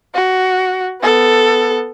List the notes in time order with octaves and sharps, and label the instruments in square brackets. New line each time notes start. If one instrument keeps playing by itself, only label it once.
[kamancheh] F#4
B3 A4